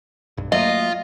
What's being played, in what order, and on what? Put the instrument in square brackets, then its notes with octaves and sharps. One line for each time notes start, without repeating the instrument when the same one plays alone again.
[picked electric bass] B1 G2
[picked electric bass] F#3 A3 A#3 [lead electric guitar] F4 [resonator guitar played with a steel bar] D#5